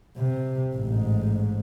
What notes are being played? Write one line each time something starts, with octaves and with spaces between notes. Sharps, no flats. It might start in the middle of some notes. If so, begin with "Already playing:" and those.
C3
A1 G#2